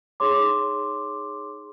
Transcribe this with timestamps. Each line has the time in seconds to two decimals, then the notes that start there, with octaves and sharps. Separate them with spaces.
0.20 D#4 G#4 C#5 C6 D6